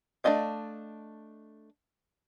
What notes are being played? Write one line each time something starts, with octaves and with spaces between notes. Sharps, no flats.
A3 D4 F4 D#5 F5